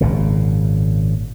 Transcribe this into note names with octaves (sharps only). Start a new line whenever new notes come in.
G#1 A#2 C#3